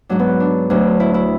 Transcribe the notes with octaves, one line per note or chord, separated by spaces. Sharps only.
G#2 F#3 D4
B3
D4
D2 D3 F#3
E4
E4